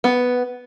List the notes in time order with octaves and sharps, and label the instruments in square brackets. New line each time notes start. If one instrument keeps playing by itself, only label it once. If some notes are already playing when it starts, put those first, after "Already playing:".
[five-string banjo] B3